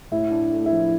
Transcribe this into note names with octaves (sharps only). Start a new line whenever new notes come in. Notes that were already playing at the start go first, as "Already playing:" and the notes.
A2 E4
D4
A3
E4
F3